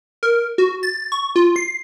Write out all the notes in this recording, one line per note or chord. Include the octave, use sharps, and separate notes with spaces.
A#4
F#4
A6
C#6
F4
C7